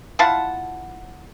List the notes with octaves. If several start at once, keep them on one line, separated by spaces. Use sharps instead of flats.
E4 F4 F#5 A5